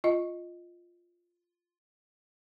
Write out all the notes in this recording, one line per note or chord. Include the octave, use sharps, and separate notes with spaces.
F4 D#5